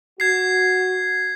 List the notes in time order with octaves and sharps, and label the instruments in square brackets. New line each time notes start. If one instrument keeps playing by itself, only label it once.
[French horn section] F#4 [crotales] G#6 C7